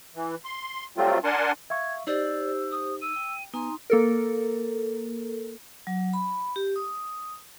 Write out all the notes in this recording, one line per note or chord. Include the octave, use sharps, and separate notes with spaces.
E3
C6
F#3 G3 A3 C4 F4
D4 A#4 F#5 G#5 A5 C6
E5 F5 C#6 G#6
D#4 G4 C5 D5 E6
D#6
E6 D#7
G5
B3 D#4 G#5 A#5 C6
A#3 A4 A#4
F#3
B5
G4
D#6